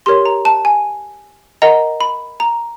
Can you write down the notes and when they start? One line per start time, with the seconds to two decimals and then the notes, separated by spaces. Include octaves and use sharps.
0.06 G4 A#4 C#5 C6
0.26 A#5
0.45 A5
0.65 G#5
1.62 A#4 D#5 F#5 A#5
2.01 B5
2.40 A#5